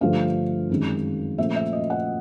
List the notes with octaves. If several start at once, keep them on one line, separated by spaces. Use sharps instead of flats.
G2 D3 F3 A3 F5
F#2 D#3 G#3 C4
A#2 F3 A3 C#4 F4 E5
E5
D#5
F#5